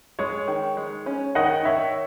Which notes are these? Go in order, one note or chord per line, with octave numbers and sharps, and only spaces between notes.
G#3 C#5
D#3
G#3
C#4
D#3 D#5 F#5
D#3 C#5 E5